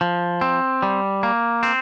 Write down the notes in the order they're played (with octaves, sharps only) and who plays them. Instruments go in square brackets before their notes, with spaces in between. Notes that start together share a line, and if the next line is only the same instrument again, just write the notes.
[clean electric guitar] F3
C4
G3
A#3
C4